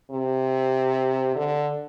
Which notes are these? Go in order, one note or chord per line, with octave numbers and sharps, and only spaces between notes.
C3
D3